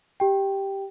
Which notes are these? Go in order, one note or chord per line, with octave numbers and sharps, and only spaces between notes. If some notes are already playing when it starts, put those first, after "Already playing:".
G4 G5